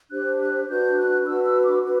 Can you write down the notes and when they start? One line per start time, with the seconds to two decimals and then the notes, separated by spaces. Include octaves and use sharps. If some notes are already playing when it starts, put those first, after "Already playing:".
0.10 D4 G4 C5 F#6
0.39 F#6
0.68 D4 F#4 B4 G6
0.97 F#6
1.25 D4 F#4 B4 E6
1.44 E6
1.64 D6
1.83 F#4 B4